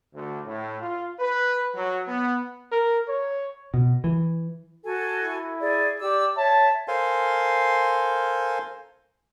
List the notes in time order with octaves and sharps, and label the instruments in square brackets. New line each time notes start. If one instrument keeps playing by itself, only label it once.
[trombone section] D2
A2
F4
B4
F#3
B3
[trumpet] A#4
C#5
[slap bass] B2
E3
[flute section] F#4 A4 G#5
[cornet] E4
[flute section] G#4 D5
[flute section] G4 E6 [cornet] D5
[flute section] C#5 E5 [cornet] A5
[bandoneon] A4 A#4 C5 F5 G#5 C6